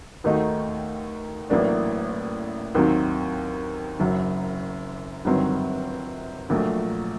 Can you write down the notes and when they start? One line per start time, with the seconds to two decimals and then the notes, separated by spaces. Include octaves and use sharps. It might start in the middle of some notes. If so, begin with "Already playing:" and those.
0.24 D#2 D#3 A3 D#4 F#4
1.50 A1 A2 F#3 A#3 D4
2.75 D#2 D#3 F#3 C4
4.00 F#1 F#2 F#3
5.25 G1 G2 D#3 F#3 C4
6.50 A#1 A#2 F#3 A3